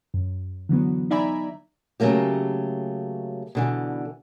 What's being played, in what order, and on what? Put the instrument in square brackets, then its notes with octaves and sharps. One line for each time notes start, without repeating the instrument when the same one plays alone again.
[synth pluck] F#2
D3 E3 F#3 B3
D#4 D5 E5 G#5 A#5 B5
[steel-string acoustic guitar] C#3 F#3 A3 A#3 G4
B2 D3 E3